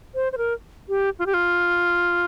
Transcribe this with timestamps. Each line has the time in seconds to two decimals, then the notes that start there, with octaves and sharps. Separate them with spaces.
0.15 C5
0.32 C5
0.38 A#4
0.89 G4
1.19 F4
1.26 G4
1.34 F4